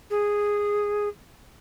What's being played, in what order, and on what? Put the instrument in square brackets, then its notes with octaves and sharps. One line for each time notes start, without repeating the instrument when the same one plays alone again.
[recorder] G#4